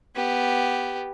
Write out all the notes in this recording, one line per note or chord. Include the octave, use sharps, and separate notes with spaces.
B3 G4